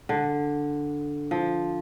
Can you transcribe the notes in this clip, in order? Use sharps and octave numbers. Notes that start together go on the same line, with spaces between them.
D3
F3